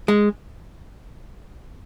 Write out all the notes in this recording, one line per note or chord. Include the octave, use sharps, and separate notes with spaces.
G#3